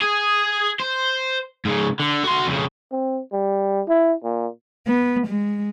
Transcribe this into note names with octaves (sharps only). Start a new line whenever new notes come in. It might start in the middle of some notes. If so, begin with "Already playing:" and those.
G#4
C5
G#2 C#3
D3
F#4 C6
F2 C#3
C4
G3
E4
A#2
B3
G#3